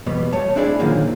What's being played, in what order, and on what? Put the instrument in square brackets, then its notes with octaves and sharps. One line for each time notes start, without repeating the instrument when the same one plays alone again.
[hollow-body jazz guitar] E2 B2 G3 B3
A3 C#5 A5
C4 D4 E4 F#4 G#4 D5
A#2 D3 D#3 F3 F#3 A#3